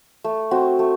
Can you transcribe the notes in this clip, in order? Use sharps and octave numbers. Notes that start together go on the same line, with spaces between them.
A3
C4 F#4
A3